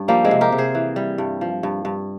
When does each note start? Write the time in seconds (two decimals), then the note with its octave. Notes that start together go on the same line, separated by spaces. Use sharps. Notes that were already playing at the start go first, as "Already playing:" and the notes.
Already playing: G2 C#4
0.08 F3 G3 A#3
0.25 G#3 C4
0.31 C3
0.41 G4 A#4
0.52 C3
0.58 G#4 C5
0.75 E3
0.96 G3
1.18 G2
1.41 F3
1.63 G2
1.85 G2